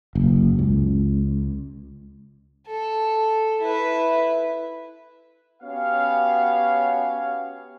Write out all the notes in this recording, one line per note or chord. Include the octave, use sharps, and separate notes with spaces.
F#1
C#2
A4
E4 B4
B3 C#4 F#4 G4 C#5 F5